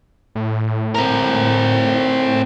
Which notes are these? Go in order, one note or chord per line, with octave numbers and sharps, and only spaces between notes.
A2
C4 A#4